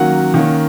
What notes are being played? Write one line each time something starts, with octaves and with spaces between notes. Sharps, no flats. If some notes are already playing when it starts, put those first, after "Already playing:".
Already playing: D#3 F#3 A#3 C#4 F#5
D#3 A#3 C#4